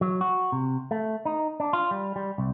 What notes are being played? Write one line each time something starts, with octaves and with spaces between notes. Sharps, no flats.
F#3
F#4
C3
A3
D#4
D4
F4
G3
G3
C2